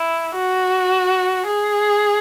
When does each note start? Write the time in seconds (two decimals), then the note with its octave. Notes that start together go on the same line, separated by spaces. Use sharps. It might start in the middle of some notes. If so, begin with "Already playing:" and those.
Already playing: E4
0.36 F#4
1.47 G#4